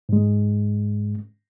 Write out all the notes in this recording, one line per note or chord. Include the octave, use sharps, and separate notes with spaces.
G#2 G#3